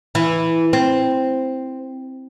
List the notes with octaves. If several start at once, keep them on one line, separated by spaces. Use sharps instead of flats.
E3
C4